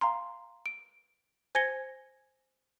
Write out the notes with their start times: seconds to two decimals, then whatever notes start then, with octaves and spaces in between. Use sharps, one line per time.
0.01 F5 G#5 A#5 C6
0.66 D7
1.55 C5 G#5 G#6 A#6 C#7 G7